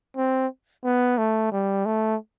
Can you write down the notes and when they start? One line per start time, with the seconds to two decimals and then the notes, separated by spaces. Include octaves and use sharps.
0.16 C4
0.84 B3
1.18 A3
1.52 G3
1.86 A3